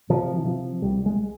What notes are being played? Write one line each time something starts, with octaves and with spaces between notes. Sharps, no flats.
C3 F3
E3
C3 F3
C2 G3
G#3